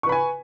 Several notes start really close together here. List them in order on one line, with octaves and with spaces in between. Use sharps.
C#6 B4 B5 G#5